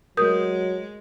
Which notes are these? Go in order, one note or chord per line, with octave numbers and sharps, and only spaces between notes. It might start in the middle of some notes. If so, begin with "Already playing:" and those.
F#3 G#3 A#4 D#6 G6